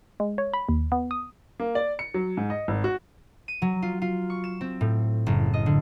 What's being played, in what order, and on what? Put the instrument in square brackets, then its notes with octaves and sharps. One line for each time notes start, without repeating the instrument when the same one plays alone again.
[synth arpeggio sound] G#3
C#5
B5
D#2
B3
D#6
[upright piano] A#3
D5
C#7
F#3
G#2
D#5
G#1
F#4
[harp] D#7
F#3
F4
F4
C#6
E7
C4
A2
F#1
D#5
D3